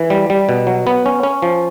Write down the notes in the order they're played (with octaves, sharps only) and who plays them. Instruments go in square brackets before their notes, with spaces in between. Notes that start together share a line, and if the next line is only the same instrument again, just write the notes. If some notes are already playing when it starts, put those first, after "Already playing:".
Already playing: [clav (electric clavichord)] E3
G3
G3
B2
F#3
B3
C#4
C#4
F3